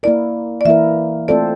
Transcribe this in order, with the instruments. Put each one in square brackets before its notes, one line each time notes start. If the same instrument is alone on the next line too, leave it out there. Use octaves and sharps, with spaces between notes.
[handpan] A#3 E4 A#4 [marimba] D5
[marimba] D5
[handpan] E3 A#3 E4 A#4 [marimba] E5
[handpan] A3 C4 F4 A4 C5 [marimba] D5